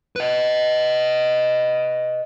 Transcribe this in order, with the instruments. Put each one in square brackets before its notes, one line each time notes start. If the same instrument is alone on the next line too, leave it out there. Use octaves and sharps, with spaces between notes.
[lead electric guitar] B4 D#5